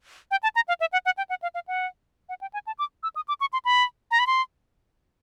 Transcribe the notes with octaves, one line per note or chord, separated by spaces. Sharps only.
G5
A5
A#5
F5
E5
F#5
F#5
G5
F#5
F5
F5
F#5
F#5
G5
G#5
A5
D6
E6
D#6
D6
C#6
C6
B5
A#5
B5
C6